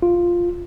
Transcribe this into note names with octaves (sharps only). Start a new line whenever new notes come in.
F4